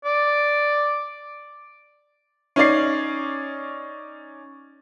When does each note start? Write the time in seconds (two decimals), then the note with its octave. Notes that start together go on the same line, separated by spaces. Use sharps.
0.05 D5
2.56 C#4 D#4 D5 C7